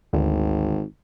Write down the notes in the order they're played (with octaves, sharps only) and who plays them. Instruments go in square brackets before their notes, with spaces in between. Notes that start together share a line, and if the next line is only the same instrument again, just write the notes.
[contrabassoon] G#1 [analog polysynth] D2